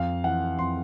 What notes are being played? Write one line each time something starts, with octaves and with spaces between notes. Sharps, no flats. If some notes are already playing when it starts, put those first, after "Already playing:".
Already playing: F2 F5
E3 F#5
F2 C6